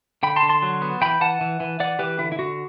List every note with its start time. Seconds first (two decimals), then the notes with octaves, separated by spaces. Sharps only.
0.23 D3 G5 B5
0.36 A5 C6
0.43 D3
0.49 A5 C6
0.62 F#3
0.82 B3
1.01 E3 G5 B5
1.21 E3 F#5 A5
1.41 E3
1.60 E3
1.80 E3 D5 F#5
1.99 E3 G4 B4
2.19 D3 E4
2.32 E4
2.39 D3 F#4